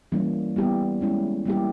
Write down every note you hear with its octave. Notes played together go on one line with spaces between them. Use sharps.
E3 G3 A#3 C#4 E4
G3 B3 E4 G4
G#3 C#4 E4
G3 A#3 E4 G4